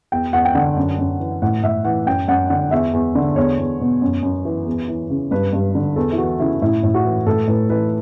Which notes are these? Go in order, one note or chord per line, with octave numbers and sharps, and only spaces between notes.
E2 G5
E2 F#5
G5
D3 F#5
F#2
F#2
E3
A2 F#5
A2 E5
E3 F#5
F#2 G5
F#2 F#5
D3 F#5
E2 E5
E2
D3
E2 C#5
E2
B2
F#2
F#2
E3
E2
E3
C#3
G2 B4
G2
D3
E2 A4
E4
E3 F#4
C#3 E4
A2 E4
A2
F#4
E3
A2 A4
A2 B4
E3 B4